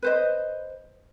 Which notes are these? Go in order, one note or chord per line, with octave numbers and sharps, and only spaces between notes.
B4 C5 D#5